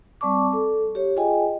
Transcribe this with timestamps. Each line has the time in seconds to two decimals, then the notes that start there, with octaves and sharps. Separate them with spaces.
0.21 G3 C4 D5 A5 C#6 D6
0.53 A4
0.95 G4 C#5
1.17 F4 G#4 D#5 G5 G#5